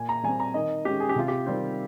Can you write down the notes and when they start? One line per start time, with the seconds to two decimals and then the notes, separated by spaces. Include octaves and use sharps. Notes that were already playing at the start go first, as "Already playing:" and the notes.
Already playing: A#2 G#5
0.09 A#5
0.23 G3 C4 G#5
0.40 A#5
0.54 D#3 D#5
0.85 G#3 C#4 G4
1.00 G#4
1.09 G4
1.16 C3 F4
1.28 G4
1.46 D#3 G3 C4